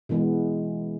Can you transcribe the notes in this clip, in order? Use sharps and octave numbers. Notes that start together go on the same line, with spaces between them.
B2 E3 G#3 B3